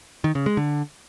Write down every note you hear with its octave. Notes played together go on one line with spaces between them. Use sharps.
D#3
C#3
G#3
D3